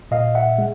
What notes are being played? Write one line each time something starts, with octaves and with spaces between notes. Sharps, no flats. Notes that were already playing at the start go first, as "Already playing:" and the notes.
A#2 D#5 F5
E5 F#5
G#3